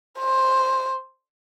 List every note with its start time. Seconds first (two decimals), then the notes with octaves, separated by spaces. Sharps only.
0.19 C5